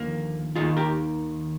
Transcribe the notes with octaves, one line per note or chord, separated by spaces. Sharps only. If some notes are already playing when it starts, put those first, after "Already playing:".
Already playing: D#2 D3 F3 A#3
D#2 D#3 F4 G#4
G4 A#4